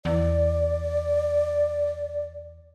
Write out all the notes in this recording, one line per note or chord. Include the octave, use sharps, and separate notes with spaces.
E2 D5